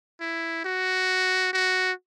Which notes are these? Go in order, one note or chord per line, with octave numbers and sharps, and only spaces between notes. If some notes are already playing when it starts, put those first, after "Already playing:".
E4
F#4
F#4